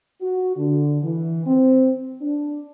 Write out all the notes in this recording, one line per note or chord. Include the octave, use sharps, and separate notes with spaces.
F#4
D3
E3
C4
D4